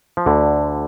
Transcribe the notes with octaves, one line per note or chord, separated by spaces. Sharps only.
F3
D2 D3